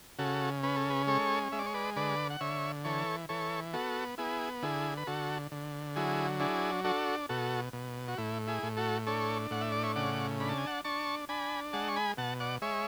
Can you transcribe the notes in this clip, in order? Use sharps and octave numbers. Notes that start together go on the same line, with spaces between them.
C#3 F#4 A4
C#4 B4
A4
G#4 B4
G#3 A4 C#5
G#3 E5
D5
C#5
B4 D5
D3 B4 D5
F#5
D3 C#5 E5
E3 A4 C#5
E3 A4 C#5
B3 F#4 A4
B3 E4 G#4
D3 E4 G#4
B4
D3 F#4 A4
D3
F#3 E4 G#4
D4 E4 G#4
D4 F#4 A4
B2 F#4 A4
B2
F#4
A2 E4
E4 G#4
A2
F#4 A4
D4 A4 C#5
A2 F#5
E5
D5
C#5 E5
C#3 D5 F#5
D4 B5
A5
G#5
F#5 A5
D4 A5 C#6
D4 G#5 B5
G#3 F#5 A5
C#6
G#5 B5
B2 F#5 A5
D5 F#5
G#3 C#5 E5